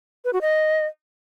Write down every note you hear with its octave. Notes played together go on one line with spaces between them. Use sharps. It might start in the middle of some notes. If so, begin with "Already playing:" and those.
B4
F#4
D#5